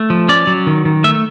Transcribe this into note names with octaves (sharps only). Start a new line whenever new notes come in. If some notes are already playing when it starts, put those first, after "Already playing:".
Already playing: A3
F3
C#4 D5
F#3
D#3
D#3
A3 E5